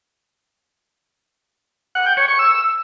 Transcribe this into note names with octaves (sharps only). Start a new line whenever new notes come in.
F#5
G5
C#5
C#6
E6